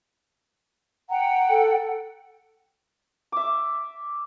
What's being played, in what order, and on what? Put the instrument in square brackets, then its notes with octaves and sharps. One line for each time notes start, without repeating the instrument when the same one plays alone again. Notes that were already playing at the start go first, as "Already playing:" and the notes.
[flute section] F#5 G5 [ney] A#5
[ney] A4
[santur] E5 D6